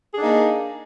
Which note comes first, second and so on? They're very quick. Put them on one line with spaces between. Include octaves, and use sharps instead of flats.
G#4 D4 D#4 A#3